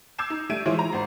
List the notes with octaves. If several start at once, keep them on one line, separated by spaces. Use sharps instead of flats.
D6 E6 G6 G#6 C7 E7
D#4
G3 A3 G#6 D7 D#7
E3 F3 G#3 E4 C5 C#5
A#5
G#1 C5